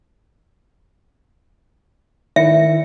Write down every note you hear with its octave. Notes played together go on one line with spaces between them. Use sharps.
D#3 E4 E5 C#7